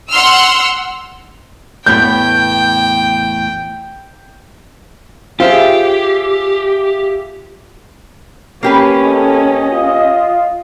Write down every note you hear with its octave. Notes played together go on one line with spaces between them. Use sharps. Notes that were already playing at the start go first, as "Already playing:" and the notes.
F#5 C6 E6 F6
E2 A2 B3 G5 G6
F4 G4 G#4 C5 E5 F5
A#3 C#4 G4 B4
A4 D#5
F4